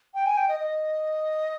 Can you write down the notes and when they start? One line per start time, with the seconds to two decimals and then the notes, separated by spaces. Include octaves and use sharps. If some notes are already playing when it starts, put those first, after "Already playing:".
0.14 G5
0.26 G#5
0.37 G5
0.48 D#5
0.60 D#5